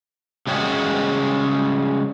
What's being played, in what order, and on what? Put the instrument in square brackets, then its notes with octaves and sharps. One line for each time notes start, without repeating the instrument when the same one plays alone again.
[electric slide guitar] C#3 G3 G#3 C#4 F#4